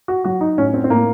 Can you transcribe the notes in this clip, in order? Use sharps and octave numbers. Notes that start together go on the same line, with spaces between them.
F#4
F#3 F#4
D#4
A2 C#4
C4
C4
A2 A#3